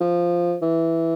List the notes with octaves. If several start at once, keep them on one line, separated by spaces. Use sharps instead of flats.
F3
E3